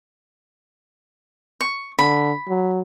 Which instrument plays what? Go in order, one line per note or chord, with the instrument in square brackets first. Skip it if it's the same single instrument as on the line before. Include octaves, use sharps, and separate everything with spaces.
[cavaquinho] C#6
[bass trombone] D3 [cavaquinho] B5
[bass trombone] F#3